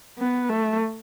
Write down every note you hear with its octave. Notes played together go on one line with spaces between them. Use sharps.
B3
A3